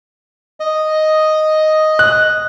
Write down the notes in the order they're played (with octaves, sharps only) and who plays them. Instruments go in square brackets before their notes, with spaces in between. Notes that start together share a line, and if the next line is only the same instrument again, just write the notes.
[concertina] D#5
[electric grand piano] F#6